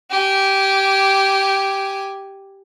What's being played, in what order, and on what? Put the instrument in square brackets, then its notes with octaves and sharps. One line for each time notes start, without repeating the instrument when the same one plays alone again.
[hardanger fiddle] G4 G#5